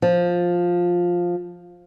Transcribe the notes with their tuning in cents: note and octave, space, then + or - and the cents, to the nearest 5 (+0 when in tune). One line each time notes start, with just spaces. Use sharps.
F3 +10